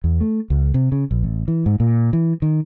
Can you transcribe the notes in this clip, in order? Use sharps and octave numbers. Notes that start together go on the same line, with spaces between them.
E2
A3
C#2
C3
C#3
A#1
A1
E3
G#2
A#2
E3
D#3